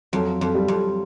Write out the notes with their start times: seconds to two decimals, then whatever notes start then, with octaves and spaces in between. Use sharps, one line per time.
0.13 F2 F#3
0.41 F2
0.55 G3
0.68 F2